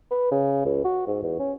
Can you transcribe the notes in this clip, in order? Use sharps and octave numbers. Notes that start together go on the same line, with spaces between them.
B4
C#3
C#2
F#4
G#2
E2
C#4